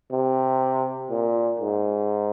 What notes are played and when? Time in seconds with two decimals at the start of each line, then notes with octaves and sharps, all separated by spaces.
0.12 C3
1.10 A#2
1.59 G#2